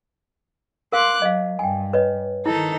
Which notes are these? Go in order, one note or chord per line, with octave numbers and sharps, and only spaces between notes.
A#4 F5 C6 D6 F#6
F#3 D#5 F5
G2 G5 G#5
B4 C#5 D#5
D#3 D#4 E4 A4